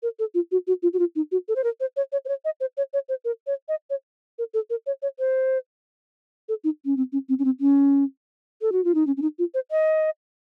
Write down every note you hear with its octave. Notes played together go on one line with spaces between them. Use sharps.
A#4
A4
F4
F#4
F#4
F4
F#4
F4
D#4
F#4
A4
C5
A#4
C5
C#5
C#5
C5
C#5
D#5
C5
C#5
C#5
C5
A#4
C#5
D#5
C#5
A#4
A4
A#4
C#5
C#5
C5
A4
D#4
C#4
C4
C#4
C4
C#4
C4
C#4
A4
F#4
F4
D#4
C#4
C#4
D#4
F4
C5
D#5